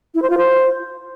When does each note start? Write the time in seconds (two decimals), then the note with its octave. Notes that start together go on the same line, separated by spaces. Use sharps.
0.15 E4
0.22 C5
0.30 F4
0.38 C5